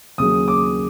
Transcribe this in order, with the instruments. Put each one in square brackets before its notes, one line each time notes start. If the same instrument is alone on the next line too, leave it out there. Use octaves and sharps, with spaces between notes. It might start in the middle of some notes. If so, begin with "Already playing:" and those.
[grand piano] D#2 C#3 F#3 D#6
D6